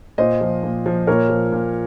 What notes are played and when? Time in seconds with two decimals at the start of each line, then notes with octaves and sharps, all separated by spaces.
0.18 A#2 C5 D#5
0.41 F3
0.63 A#2
0.86 F3
1.07 A#2 A#4 C#5
1.30 F3
1.52 A#2